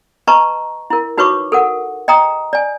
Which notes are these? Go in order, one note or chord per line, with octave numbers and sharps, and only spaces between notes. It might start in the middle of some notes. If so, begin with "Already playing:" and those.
B4 D#5 A5 A#5 C#6
E4 A#4
D#4 F#4 B4 C#5 C#6 D6
A4 A#4 F#5
D#5 G5 A#5 D#6
D5 G#5